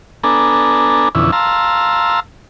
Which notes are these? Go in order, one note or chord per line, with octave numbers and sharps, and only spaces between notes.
B3 D4 A4 G#5 A#5
F2 B2 D3 E3 C#4 E4
F5 A5 A#5 C6 E6